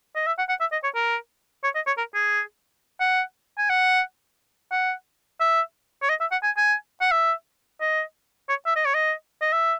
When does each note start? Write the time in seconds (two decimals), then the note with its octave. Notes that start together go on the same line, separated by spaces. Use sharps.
0.16 D#5
0.27 E5
0.38 F#5
0.49 F#5
0.60 E5
0.72 D#5
0.84 C#5
0.95 A#4
1.64 C#5
1.75 D#5
1.87 C#5
1.98 A#4
2.14 G#4
3.00 F#5
3.58 G#5
3.70 F#5
4.72 F#5
5.40 E5
6.02 C#5
6.09 D#5
6.21 E5
6.32 F#5
6.43 G#5
6.57 G#5
7.01 F#5
7.11 E5
7.81 D#5
8.49 C#5
8.66 E5
8.76 D#5
8.85 C#5
8.95 D#5
9.41 D#5
9.53 E5